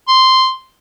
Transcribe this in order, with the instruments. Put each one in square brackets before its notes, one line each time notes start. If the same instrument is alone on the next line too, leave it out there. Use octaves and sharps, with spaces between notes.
[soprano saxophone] C6